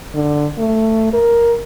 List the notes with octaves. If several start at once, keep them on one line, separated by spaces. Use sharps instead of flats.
D3
A3
A#4